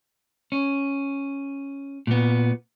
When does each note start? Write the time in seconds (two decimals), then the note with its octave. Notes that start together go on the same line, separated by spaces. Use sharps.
0.52 C#4
2.07 A#2 B3